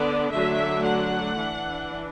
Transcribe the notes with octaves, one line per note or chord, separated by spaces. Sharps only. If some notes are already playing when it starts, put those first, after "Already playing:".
Already playing: D3 B3 D4 D5
D3 F#3 A3 D4 E5
F#5
E3 D4